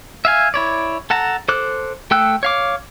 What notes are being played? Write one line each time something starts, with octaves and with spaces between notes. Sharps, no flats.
E5 F5 G#5
E4 C#5 D5
A4 F#5 A5 A#5
A4 C5 D6 F#6
A3 A4 G5 E6 F#6
C#5 F5 D6